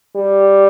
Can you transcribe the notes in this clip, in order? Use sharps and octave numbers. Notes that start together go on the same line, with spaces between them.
G3